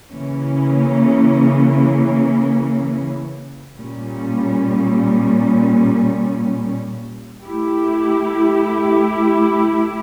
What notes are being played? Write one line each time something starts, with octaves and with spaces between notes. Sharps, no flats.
C#3 E3 A#3 C#4
A#2 G3 C#4
A3 E4 G4